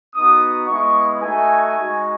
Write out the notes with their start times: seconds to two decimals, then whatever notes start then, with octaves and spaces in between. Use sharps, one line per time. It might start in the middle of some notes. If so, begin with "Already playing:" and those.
0.15 B3 D#4 F#4 D#6
0.68 G#3 B3 E4 C#6
1.22 A3 D#4 F#4 G#5
1.76 G#3 D#4 F#4